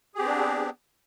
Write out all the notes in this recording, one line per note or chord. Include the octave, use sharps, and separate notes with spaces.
B3 C4 D4 G4 G#4